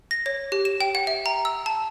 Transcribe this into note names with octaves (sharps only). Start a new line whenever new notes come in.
A#6
C#5
G4
E7
G5
F#5
E5
A#5
E6
A5